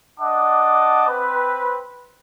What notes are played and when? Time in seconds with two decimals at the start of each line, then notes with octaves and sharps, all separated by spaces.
0.20 D4 D#5 F#5 A5 D6
1.08 C4 B4